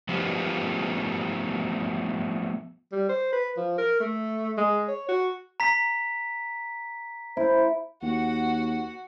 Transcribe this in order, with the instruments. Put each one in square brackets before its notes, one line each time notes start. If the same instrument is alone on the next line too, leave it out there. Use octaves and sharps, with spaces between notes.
[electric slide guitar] F3 A3 B3 F4 G4
[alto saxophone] G3
C5
B4
F3
A#4
A3
G#3
C#5
F#4
[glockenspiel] A#5 B6
[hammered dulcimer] E4 [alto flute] C5
[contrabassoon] D#2 [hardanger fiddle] F#4 F#5